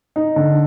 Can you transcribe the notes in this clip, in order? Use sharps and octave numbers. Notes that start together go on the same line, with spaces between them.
D#4
D3